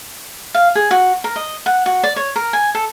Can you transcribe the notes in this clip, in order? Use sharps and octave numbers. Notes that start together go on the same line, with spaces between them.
F5
G#4
F#4
A#4
D#5
F#5
F#4
D5
C#5
A#4
G#5
A4